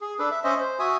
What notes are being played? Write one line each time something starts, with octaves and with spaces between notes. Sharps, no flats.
G#4
D4 A4 B4
E5
C#4 C5 D#5 E5
C5
F#4 E5 G#5 D#6